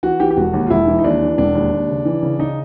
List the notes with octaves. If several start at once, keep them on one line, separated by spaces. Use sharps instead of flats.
E3 F#4
E3 G4
G4
E1 F#4
D#2
F4
E1 E4
E3
D#4
D#2 D4
E3
E1 D4
D#2
D#2
C#3
E3
C#3
C#3 D#4